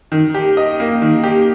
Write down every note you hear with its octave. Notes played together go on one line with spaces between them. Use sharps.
D#3
G4
D#5
A#3
D#3
G4